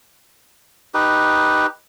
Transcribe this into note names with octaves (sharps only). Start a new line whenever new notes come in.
D#4 G4 B4